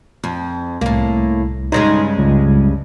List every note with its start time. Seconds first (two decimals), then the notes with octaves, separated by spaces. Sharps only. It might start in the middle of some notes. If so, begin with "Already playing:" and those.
0.24 F2
0.81 C2 A2 A#3
1.72 G2 C#3 G#3 D#4 C6 A#6
2.19 C#2